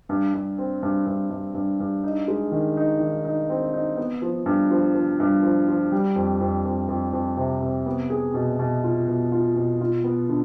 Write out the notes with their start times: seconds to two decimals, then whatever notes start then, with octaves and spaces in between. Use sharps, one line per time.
0.09 G2
0.34 G2
0.58 C4
0.83 G2
1.07 G2
1.30 G2
1.54 G2
1.80 G2
2.04 D#4
2.28 G#3
2.51 D#3
2.77 D#4
3.00 D#3
3.25 D#4
3.49 C4
3.73 D#4
3.97 B3
4.22 F3
4.46 G2
4.70 F3
4.94 F3
5.20 G2
5.43 F3
5.68 F3
5.92 G3
6.16 F2
6.41 F2
6.65 F2
6.88 F2
7.13 F2
7.37 C3
7.62 C3
7.86 B3
8.10 G#4
8.34 B2
8.59 B2
8.84 F4
9.08 B2
9.32 F4
9.56 B2
9.81 F4
10.04 B3
10.29 D3